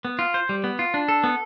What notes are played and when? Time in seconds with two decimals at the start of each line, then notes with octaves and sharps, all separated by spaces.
0.05 B3
0.19 F4
0.34 C5
0.49 G3
0.64 B3
0.79 F4
0.94 D4
1.08 A4
1.24 B3